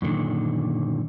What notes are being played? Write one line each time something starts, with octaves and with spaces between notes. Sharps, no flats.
F#2 A#2 D3 D#3